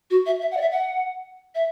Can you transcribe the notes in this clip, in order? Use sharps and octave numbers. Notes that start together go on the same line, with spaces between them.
F#4
E5
E5
F#5
D5
E5
F#5
E5